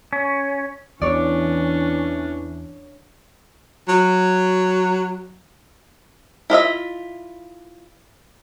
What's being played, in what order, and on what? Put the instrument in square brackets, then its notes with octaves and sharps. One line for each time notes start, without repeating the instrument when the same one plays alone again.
[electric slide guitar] C#4
[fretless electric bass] E2 [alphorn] E3 [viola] C#4 D4 [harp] C#5 D5
[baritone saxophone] F#3
[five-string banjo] E4 F4 D#5 E5